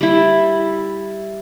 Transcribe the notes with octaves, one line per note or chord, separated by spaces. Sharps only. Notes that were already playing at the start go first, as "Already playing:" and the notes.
G3 E4